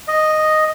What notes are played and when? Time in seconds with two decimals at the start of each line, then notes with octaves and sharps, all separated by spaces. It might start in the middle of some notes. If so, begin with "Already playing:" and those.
0.08 D#5